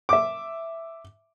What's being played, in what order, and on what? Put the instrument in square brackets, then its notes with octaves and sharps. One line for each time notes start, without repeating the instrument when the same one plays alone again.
[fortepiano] E5 D6